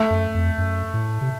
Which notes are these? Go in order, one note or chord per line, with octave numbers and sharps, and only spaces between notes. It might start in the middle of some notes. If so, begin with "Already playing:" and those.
Already playing: A3
F#2
F2
F#2
A2
C3